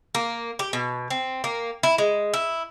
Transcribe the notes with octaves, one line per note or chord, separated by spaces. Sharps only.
A#3
G4
B2
C4
A#3
E4
G#3
E4